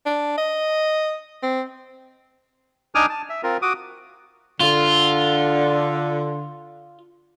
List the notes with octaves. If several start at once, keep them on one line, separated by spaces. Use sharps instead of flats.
D4
D#5
C4
D4 D#4 G#5 D6 D#6 F6
A5
E5
C4 F4 A#4
F#4 D6 D#6
D3 F4